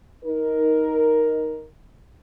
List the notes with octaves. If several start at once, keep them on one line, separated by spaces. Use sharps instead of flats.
D#4 A#4